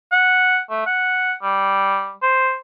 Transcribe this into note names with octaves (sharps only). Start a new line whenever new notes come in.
F#5
A3
F#5
G3
C5